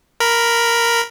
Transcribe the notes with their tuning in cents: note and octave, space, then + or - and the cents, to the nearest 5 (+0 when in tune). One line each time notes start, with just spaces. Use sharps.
A#4 +0 B5 +0